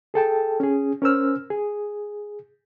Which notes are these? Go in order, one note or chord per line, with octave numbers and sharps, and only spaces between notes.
G#4 A4 G5 A5
C#4 G#4
C#4 A#4 C5 E6 F6
G#4